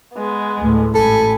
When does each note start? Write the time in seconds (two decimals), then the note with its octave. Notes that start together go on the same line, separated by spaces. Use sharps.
0.15 G#3 B3
0.59 D2 A2
0.95 A1 G#2 A4 G#5 B5